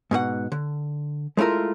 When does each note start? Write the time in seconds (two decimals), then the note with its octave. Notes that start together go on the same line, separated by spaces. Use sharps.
0.11 G#2 B2 G#4 F#5
0.52 D3
1.37 G#3 A3 E4 F4 A#4